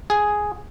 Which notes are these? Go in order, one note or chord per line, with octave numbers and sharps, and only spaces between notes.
G#4